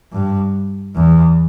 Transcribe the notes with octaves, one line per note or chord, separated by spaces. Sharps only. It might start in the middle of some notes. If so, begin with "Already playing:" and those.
G2
E2